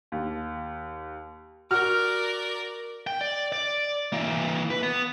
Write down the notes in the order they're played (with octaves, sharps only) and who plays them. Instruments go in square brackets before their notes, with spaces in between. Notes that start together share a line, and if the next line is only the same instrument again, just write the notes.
[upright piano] D#2
[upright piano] F#4 [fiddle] A#4 D5 [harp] F6
[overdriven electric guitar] G5
D5
D5
E3 A#3
B4
B3